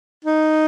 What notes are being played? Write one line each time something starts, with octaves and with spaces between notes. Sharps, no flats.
D#4